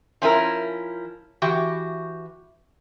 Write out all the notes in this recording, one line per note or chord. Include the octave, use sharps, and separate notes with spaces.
F3 C#4 E4 A#4
E3 F#4 G4